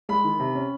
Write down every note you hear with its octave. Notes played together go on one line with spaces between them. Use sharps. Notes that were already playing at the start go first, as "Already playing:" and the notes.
G#3 B5
D#3
C3
C#4